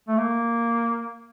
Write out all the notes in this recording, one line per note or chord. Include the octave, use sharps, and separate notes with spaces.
A3
A#3